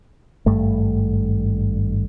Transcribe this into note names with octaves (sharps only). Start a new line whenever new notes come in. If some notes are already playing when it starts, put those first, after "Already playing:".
G#1 G2 A3